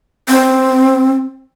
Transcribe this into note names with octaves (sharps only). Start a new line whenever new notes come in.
C4